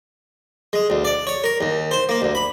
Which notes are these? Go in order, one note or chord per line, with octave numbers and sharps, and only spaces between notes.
G#3
D2
D5
C#5
A#4
D#2
C5
A#3
D2
B5